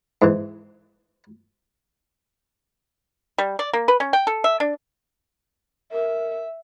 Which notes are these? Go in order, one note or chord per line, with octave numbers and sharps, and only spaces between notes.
G#2 E3
G3
D5
A#3
B4
C#4
G5
A4
E5
D4
A#4 E5